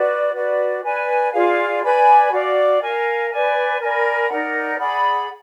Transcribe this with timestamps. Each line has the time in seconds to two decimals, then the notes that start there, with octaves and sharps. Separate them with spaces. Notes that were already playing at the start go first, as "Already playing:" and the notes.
Already playing: F#4 B4 D5
0.34 F#4 B4 D5
0.83 B4 D5 G#5
1.32 F4 G#4 D5 F5
1.82 B4 D5 G#5 B5
2.31 F#4 D5 F5
2.81 A#4 F5 G#5
3.31 B4 D5 G#5
3.80 A#4 D5 G#5 B5
4.29 D#4 A#4 D5 F#5
4.78 G#4 D5 F#5 B5